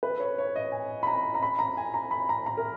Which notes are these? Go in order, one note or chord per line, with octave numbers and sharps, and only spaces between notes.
B4
C#5
C#5
D#5
G#5
B5
A#5
A#5
B5
A#5
G#5
A#5
B5
A#5
A#5
A#4